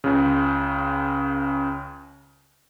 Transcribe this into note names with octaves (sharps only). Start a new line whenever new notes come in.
C#2 C#3